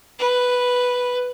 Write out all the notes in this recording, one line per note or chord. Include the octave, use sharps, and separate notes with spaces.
B4